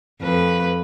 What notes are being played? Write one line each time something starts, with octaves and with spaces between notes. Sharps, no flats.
F2 B4